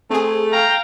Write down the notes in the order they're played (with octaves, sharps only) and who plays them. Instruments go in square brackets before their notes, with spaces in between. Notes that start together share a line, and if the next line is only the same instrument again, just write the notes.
[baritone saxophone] A3 [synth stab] C4 G#4
[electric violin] F5 G5 [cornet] A#5